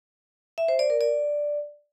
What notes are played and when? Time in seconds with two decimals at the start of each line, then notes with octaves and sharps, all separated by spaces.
0.58 E5
0.68 C5
0.79 D5
0.90 A#4
1.01 D5